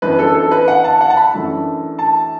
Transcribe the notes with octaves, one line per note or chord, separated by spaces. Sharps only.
F#2 E3 B3 D4 B4
A4
A4
B4
F#5
A5
F#5
A5
B5
F#2 E3 A3 D4
A5